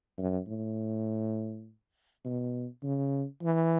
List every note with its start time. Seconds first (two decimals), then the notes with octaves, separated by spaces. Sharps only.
0.18 F#2
0.47 A2
2.25 B2
2.83 C#3
3.43 E3